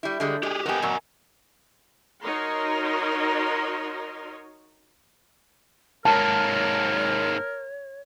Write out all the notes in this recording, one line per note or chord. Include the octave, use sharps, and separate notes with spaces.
G3 E4
D3 G3 G#3
G#3 G4 G#4
B3 G4 A#4 D#5 G#5
A#2 F#3
D#4 F#4 A#4 C#5 D#5 C6
G#2 A#3 A#4 C#5 A5